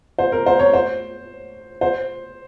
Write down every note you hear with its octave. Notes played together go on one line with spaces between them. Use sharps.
C5
A#4
C5
C#5
C5
C5